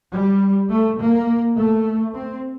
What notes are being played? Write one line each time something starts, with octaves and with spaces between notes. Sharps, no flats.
G3
A3
A#3
A3
C4